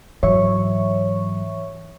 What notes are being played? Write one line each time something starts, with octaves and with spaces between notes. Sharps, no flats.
G#2 E3 F#3 C#5 E5 C#6